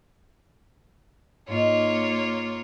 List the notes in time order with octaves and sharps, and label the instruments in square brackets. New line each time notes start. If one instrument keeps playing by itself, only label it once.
[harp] G#2 D#4 [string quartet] A#3 F4 C#5